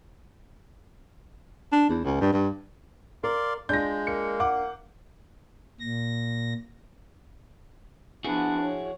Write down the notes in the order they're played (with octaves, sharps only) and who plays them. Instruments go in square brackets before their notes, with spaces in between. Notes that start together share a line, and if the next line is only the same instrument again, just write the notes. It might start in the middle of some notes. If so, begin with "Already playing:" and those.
[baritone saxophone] D4
E2
C#2
G2
G2
[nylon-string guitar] A#4 [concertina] D5 F5 C6
[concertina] G#3 [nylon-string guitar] D4 F4 [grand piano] G6 A#6
[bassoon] A#3 [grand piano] C#7
[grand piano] F#5 D6
[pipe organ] A#2 A#6
[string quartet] F3 B3 [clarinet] D4 [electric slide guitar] E4 F#4 G#4
[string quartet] C#5